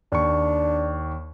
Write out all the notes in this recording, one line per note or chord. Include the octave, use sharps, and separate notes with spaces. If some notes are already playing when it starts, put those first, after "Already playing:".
D#2 D4 C#6